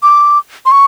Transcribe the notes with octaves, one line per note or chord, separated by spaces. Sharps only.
D6
C6
C#6